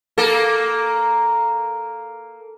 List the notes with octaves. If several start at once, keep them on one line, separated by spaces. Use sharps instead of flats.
A#3 A4